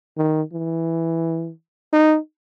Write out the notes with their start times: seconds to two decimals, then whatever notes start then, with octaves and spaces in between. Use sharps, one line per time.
0.18 D#3
0.52 E3
1.93 D#4